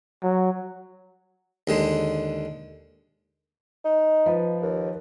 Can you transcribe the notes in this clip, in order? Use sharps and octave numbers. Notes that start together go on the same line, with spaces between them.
F#3
D#2 D3 G#3
D#4
F3 B4
D#2